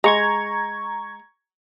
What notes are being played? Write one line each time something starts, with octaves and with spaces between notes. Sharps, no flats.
G#3 A#5 C#6 G#6